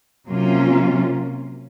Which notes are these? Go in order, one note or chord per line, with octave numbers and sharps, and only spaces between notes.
C3 F#3 A#3 C#4 F4